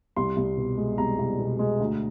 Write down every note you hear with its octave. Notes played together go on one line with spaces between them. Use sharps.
C2 C6
C2
B2
G#3
C2 A#5
C2
B2
G#3
D2